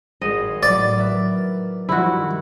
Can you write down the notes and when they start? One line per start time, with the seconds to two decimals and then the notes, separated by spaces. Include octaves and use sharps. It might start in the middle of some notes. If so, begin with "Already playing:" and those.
0.21 G#1 G#4 D#5
0.63 A2 F#3 D5
0.98 A#4 B4 E5
1.89 G2 D#3 F3 E4 F#4